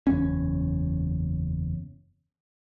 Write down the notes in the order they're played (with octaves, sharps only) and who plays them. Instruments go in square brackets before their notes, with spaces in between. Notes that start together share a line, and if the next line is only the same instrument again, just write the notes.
[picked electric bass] F#1 E2 C#4